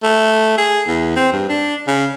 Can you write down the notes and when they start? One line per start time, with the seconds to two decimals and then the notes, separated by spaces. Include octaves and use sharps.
0.03 A3
0.58 G#4
0.87 E2
1.16 C4
1.33 G2
1.49 D4
1.88 C#3